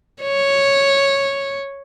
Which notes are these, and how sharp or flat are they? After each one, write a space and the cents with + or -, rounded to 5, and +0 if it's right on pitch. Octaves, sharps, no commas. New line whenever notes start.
C#5 -5